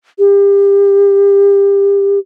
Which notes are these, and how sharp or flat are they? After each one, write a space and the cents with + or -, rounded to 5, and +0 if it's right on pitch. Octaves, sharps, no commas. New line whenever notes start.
G4 +30